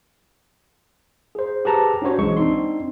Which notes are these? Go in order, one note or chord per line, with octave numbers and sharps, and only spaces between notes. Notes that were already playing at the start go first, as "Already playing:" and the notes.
G#4 C5
G4 G#4 B4 A5 A#5
C#4 D4 F#4 C5 C#5
B1 E3 G#3 C#6
C4 D4 D#4 C6